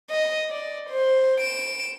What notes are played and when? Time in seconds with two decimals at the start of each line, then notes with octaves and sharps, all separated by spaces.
0.10 D#5
0.50 D5
0.90 C5
1.41 D7 E7